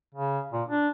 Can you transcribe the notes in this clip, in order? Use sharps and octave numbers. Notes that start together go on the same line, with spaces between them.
C#3
A#2
D4